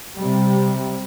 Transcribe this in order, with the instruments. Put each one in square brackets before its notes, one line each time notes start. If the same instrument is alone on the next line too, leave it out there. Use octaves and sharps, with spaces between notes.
[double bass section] C3 G3